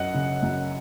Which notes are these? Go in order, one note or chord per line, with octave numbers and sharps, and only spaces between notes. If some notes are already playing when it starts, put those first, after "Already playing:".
Already playing: F#2 D#5 F#5
C#3
F#2